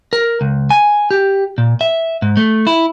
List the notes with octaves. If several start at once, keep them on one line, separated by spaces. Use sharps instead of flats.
A#4
C#2
G#5
G4
A#2
E5
G#2
A3
E4